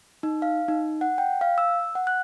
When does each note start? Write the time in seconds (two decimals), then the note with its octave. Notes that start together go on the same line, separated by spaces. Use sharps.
0.23 D#4
0.42 F5
0.68 D#4
1.01 F#5
1.18 G5
1.41 F5
1.58 E6
1.95 F#5
2.07 F#6